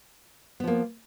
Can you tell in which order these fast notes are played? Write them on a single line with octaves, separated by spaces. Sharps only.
B3 F3 A#3